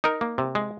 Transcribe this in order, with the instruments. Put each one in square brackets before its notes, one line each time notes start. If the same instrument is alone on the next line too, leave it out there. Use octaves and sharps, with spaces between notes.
[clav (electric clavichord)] D#4 A#4
A#3
C3
G#3